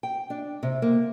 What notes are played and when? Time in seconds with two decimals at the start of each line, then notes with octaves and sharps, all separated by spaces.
0.03 G5
0.30 D4
0.63 C3
0.82 A#3